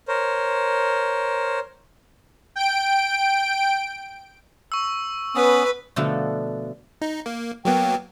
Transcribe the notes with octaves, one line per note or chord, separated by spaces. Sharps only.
A#4 C5 C#5
G5 D7
C#6 E6
B3 C#4 B4 D#6
B2 D3 F3 A3 F#4 A4
D#4
A#3
F#3 A#3 B3 G5